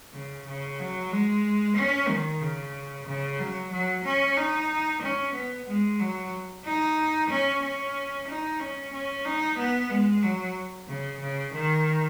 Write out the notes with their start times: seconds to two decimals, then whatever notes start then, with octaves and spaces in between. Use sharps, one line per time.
0.13 C#3
0.46 C#3
0.79 F#3
1.11 G#3
1.76 C#4
2.09 D#3
2.41 C#3
3.07 C#3
3.39 F#3
3.71 F#3
4.05 C#4
4.37 D#4
5.02 C#4
5.34 B3
5.67 G#3
6.00 F#3
6.65 D#4
7.30 C#4
7.62 C#4
8.28 D#4
8.60 C#4
8.92 C#4
9.25 D#4
9.58 B3
9.90 G#3
10.23 F#3
10.88 C#3
11.20 C#3
11.53 D#3